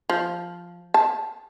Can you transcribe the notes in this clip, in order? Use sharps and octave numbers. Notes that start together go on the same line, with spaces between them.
F3
A5